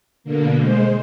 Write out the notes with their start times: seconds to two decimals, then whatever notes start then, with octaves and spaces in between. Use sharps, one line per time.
0.24 B2 D3 A#3
0.58 G#3 C5